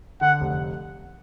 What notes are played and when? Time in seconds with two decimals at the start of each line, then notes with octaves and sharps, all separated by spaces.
0.21 D3 F#5
0.40 F1